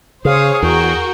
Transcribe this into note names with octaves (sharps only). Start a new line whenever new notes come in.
C#3 G#4 C5 C#5 F5 D#6
E2 F#4 A#4 G5